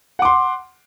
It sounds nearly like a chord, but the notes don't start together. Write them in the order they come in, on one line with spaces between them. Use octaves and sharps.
F#5 D6 C6